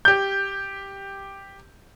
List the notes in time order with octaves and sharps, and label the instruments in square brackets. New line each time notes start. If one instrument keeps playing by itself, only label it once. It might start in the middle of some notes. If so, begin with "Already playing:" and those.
[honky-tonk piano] G4 G6